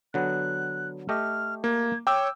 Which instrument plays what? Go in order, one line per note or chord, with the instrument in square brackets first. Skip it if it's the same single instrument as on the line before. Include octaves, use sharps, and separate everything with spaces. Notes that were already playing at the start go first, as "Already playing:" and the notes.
[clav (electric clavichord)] D3 F#3 B3 [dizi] F#6
[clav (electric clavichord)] A3 G4 D#5 [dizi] F6
[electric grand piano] A#3 [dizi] G#6
[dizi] C#5 [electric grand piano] G5 D6 E6